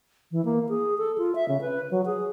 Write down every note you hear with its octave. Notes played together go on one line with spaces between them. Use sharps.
E3
A#3
G#4
A4
F4
E5
C#3
B4
F#3
G#4